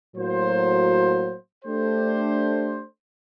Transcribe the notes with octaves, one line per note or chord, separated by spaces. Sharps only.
A2 F#3 A#3 F#4 C5
A3 D4 G4 C5